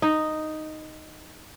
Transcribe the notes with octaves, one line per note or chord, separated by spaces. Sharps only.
D#4